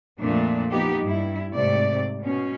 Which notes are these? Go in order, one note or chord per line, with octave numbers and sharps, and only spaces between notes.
F2 A#2 A3 D4
F3 B3 D#4 G4
G2 E4
G#2 C3 A3 D5
B2 C#4